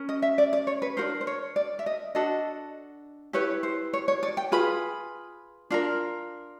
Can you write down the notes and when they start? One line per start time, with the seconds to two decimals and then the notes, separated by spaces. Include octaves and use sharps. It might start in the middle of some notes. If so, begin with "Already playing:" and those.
Already playing: C#4 A#4
0.09 D#5
0.22 E5
0.38 D5
0.53 D5
0.67 C#5
0.82 B4
0.97 D4 F#4 A#4 C5
1.21 C5
1.27 C#5
1.56 D5
1.79 E5
1.86 D#5
2.15 D4 F#4 A4 D#5
3.33 E4 G4 B4 C#5
3.63 C5
3.93 C#5
4.08 C#5
4.23 D5
4.37 G5
4.52 F4 G#4 B4 B5
5.70 D4 F4 A#4